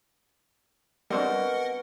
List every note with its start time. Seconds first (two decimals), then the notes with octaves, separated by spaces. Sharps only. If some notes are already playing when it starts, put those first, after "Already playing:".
1.10 B2 G3 C4 D4 F#4 A#4 D#5 F#5